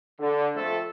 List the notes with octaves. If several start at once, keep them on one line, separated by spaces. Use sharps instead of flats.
D3
F2 A3 A4